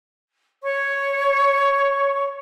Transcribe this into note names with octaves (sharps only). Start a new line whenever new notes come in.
C#5 C#6